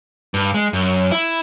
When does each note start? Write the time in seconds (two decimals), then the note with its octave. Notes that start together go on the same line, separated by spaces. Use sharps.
0.34 G2
0.54 G#3
0.73 F#2
1.12 E4